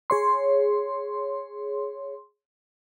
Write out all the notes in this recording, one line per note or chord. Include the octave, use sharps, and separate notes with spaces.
G#4 C#5 C6